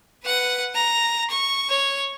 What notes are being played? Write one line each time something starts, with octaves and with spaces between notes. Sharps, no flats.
B4 F#5
A#5
C#6
C#5